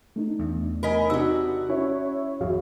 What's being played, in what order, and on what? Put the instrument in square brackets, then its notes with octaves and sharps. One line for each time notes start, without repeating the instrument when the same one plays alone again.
[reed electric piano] A3 D4 D#4
[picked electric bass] E2
[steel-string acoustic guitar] A#4 D#5 G#5 [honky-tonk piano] B5 B6
[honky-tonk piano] C3 C4 D#4 [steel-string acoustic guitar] D4 F#4 [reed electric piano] E6
[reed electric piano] C#4 [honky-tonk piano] E4 C#5 E5
[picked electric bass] G#1 F2 [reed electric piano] F#4 G#4 F5